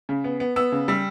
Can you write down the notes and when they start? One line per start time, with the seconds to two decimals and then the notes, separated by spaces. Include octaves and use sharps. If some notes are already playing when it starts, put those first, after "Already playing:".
0.09 C#3
0.24 B3
0.40 B3
0.56 B3 E6
0.72 C#3
0.88 G3 E6